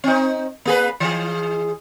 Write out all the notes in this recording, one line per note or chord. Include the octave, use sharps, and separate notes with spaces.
C4 D#4
A#3 G#4 B4
E3 G#4